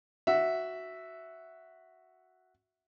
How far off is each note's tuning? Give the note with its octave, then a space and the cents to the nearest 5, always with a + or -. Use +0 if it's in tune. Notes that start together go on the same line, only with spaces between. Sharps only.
F#4 +0 E5 +0